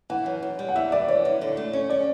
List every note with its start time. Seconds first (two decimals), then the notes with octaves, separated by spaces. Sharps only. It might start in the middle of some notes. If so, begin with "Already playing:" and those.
0.10 E3 F#5
0.26 F#2
0.43 F#2
0.59 G3
0.69 F#5
0.76 E3 E5
0.92 E3 D5
1.08 C#4 C#5
1.25 F#2
1.41 D3
1.57 A3
1.73 C#4 C#5
1.90 C#4 D5